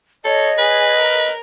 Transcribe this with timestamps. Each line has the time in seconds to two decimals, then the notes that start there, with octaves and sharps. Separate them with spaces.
0.25 A4 C#5 D#5
0.58 G#4 B4
0.99 A#4